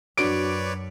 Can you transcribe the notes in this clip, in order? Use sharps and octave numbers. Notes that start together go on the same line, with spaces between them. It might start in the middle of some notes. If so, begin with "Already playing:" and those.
F#2 D4 F#4 B4 C#5 D5 D6 D7